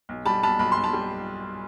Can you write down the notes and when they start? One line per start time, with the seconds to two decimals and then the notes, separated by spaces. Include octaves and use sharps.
0.09 B1
0.26 G3 A5 B5
0.43 B1 A5 B5
0.59 B1 B5
0.72 B1 C6
0.84 A5 B5
0.93 G3